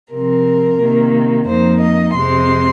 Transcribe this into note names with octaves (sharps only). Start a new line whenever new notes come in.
C3 F3 C4 A#4
C3 D#3 A#3
F2 F3 A#3 D#4 C5
D#5
F2 C3 F3 G#3 C4 C6